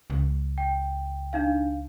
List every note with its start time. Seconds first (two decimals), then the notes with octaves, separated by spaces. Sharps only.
0.10 C#2
0.58 G5
1.33 D4 D#4 F5